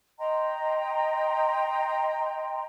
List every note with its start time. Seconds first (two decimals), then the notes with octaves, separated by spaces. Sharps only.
0.20 D#5 G5 A#5 C6